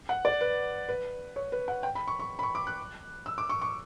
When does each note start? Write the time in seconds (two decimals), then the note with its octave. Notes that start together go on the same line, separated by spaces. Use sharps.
0.09 F#5
0.25 D5
0.41 B4
0.89 B4
1.36 C#5
1.52 B4
1.68 F#5
1.83 G5
1.95 B5
2.08 C#6
2.19 C#6
2.39 B5
2.43 C#6
2.55 D6
2.67 F#6
3.26 E6
3.38 D6
3.49 C#6
3.62 C#6